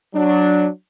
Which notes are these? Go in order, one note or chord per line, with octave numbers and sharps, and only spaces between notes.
F#3 D4